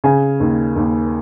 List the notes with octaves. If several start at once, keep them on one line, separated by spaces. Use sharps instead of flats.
C#3 G#5
D#2
D#2